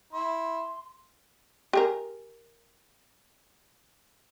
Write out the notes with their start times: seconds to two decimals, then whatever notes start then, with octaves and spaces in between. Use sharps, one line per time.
0.13 E4 C6
1.73 G4 G#4 A#4